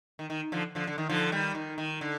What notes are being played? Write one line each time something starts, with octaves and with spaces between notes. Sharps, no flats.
D#3
D#3
D3 F3
D3 F3
D3
D#3
D3 F3
D#3 G3
D#3
D#3
D3